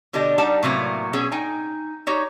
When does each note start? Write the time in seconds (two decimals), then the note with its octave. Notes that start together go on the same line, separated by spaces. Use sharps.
0.13 B2 D3 D4 G4 D#5
0.38 G3 D#4 G4 F#5 A5
0.63 A2 C3 F#3 A#3 B3
1.13 B2 F#3 C#4 G#4
1.32 D#4 G5 G#5
2.07 D#4 F#4 G4 C#5